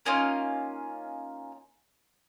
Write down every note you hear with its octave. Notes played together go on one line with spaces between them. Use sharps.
A#3 C#4 D#4 F4